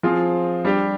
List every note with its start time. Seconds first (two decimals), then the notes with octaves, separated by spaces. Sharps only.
0.03 F3 C4 F4 G#4
0.65 G3 D4 G4